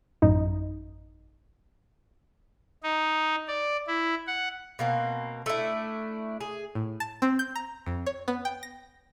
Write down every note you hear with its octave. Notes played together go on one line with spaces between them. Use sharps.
A1 F#2 D#4
D#4
D5
E4
F#5
B2 A#3 C4
A3 D4 E4
G#4
A2
A5
C4
G6
A#5
F2
C#5
B3
G5
A#6